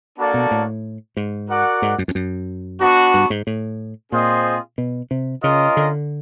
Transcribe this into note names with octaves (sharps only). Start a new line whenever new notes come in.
A#3 D4 F#4 A4 D5
B2
A2
G#2
F#4 A#4 D5 F#5
G#2
F#2
F2
F#2
B3 D4 F#4
G2
G#2
A2
A#2 C4 F4 G#4 C5 D#5
B2
C3
C#3 C#4 F4 A#4 D#5
D3